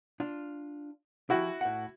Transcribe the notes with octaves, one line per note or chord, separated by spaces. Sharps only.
D4 F4
F3 E4 F#4 G4
A2 F#5